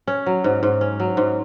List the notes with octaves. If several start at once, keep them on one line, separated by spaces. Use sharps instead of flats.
C#4
F#3
G#2
G#2
C#4
F#3
G#2